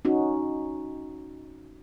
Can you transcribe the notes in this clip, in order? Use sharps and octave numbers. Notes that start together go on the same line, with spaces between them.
C#4 D#4 F#4